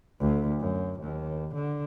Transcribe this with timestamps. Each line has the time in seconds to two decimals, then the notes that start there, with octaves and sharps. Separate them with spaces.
0.21 D2
0.60 F#2
1.00 D#2
1.55 D3